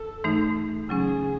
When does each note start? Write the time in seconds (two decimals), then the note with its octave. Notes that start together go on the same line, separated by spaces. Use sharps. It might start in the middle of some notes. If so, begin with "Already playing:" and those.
Already playing: A4
0.24 G#2 E3 A3 D#4
0.89 C#3 F#3 C#4 G#4